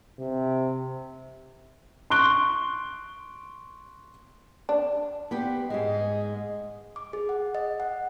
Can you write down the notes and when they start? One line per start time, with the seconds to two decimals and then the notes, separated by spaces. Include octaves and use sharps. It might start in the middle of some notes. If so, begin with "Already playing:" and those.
0.19 C3
2.10 C6 C#6 F#6 D7 G7
4.69 D4
5.31 B3 G4 C5
5.70 G#2 G#3 D#5
6.96 D6
7.13 G#4
7.29 F#5
7.55 D#5
7.80 F#5